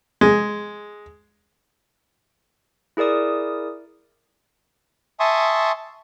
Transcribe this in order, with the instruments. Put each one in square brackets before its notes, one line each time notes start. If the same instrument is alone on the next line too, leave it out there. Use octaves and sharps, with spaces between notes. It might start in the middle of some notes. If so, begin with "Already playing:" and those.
[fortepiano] G#3
[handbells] E4 G#4 A#4 D5 D#6
[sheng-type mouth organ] E5 G#5 A5 C6 C#6 D#6